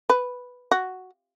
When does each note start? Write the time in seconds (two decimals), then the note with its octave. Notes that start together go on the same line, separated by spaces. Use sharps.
0.10 B4
0.71 F#4